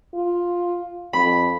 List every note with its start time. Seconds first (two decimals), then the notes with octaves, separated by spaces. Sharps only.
0.14 F4
1.13 F2 B5